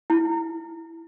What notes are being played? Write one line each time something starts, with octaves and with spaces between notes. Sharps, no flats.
E4